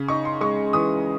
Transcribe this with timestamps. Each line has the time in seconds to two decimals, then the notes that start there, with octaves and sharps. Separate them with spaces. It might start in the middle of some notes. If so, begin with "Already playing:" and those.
Already playing: C#3
0.08 D#4 C#6
0.25 C6
0.41 G#3 C#6
0.73 E3 D#6